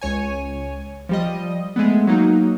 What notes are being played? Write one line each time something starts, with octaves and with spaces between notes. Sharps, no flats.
C#2 C#5 G#5
F3 G3 D#5
G#3 A3 B3
F#3 A#3 D#4